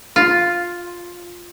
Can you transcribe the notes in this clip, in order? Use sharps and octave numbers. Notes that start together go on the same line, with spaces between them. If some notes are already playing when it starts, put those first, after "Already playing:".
F4